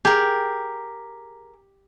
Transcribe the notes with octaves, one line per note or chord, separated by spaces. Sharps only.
G4 G#4 A#4